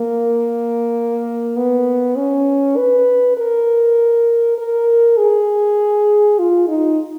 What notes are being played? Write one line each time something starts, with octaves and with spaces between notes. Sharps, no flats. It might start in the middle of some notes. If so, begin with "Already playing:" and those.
Already playing: A#3
B3
C#4
B4
A#4
A#4
G#4
F4
D#4